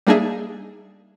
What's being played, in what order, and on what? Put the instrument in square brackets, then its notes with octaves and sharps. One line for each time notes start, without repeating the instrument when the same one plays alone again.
[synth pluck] G3 A#3 D4 D#4 G#4 E5